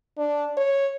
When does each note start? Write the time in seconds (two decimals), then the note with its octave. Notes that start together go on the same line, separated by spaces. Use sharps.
0.18 D4
0.57 C#5